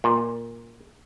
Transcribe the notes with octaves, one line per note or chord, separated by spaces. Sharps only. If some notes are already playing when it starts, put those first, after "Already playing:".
A#2